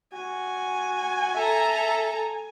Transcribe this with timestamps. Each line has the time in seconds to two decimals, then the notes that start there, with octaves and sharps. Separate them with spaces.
0.13 F#4 G#5
1.35 A4 E5 A#5